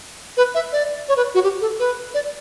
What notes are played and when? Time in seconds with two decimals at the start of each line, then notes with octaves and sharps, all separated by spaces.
0.37 B4
0.55 E5
0.72 D5
1.08 C#5
1.17 B4
1.34 F#4
1.43 G4
1.61 A4
1.79 B4
2.14 D5